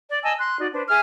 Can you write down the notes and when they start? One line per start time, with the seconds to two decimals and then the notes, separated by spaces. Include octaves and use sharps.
0.08 D5
0.23 D#5 G#5 A5 E6
0.38 C6 F#6
0.58 D#4 F#4 D5
0.73 D4 B4 C5
0.88 G#4 E5 G#5 F6